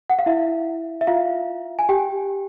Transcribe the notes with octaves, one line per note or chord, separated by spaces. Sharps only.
F#5
F5
E4 E5
E5
F4 F5
G#5
G4 G5